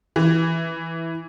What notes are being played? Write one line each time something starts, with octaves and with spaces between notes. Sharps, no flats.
E3